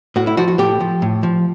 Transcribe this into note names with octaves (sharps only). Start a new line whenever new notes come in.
A2 F#4
E4
F3 F#4
F#4
A2 G4
F3
A2
F3